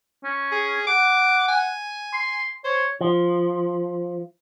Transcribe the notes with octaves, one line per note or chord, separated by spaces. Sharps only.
C#4
G#4
F#5 D6
G#5
C6
C5 C#5
F3